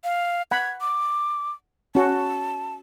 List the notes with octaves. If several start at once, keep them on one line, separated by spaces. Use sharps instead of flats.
F5
F#5 B5 G#6
D6
C#4 F#4 A5